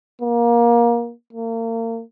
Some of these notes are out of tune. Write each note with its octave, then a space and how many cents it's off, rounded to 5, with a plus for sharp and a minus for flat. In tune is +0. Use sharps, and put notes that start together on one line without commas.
A#3 +20
A#3 -35